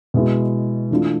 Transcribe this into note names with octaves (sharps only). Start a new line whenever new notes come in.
B2 G#3 B3 E4
E3 A3 D4 F4